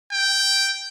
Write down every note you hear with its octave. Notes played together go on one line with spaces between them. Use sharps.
G5